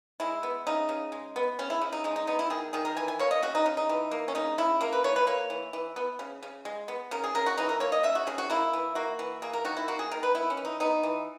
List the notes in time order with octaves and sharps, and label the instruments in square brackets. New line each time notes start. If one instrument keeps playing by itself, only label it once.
[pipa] G#3 E4
B3
C#3 D#4
C#3
G#3
B3
C#3 C#4
E4
C#3
D#4
G#3 D#4
D#4
B3 D#4
E4
D#3 G#4
D#3 G#4
A#4
E3 G#5
G#5
A#3 C#5
D#5
C#3 F#4
D#4
C#3
D#4
E3
A#3
C#4
C#3 D#4
C#3 E4
A#3 A#4
B4
E3 C#5
B4
A#3 C#5
E3
E3
B3
C#3
C#3
G#3
B3
C#3 A#4
G#4
C#3 A#4
F#4
E3 D#4
A#4
A#3 C#5
D#5
C#3 E5
F#4
C#3 G#4
F#4
A#3 E4
E3
A#3 F#4
E3
A#3 G#4
A#4
D#3 F#4
E4
A#3 F#4
G#4
D#3 A#4
B4
B3 E4
C#4
E3
D#4
B3 D#4
E3